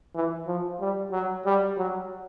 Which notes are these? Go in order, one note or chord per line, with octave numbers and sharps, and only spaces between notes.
E3
F3
G3
F#3
G3
F#3